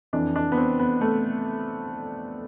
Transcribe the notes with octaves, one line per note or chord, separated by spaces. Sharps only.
F2 E3 D4
D4
B3
C4
B3
A3